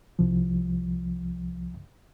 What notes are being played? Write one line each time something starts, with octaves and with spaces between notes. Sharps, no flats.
C2 F3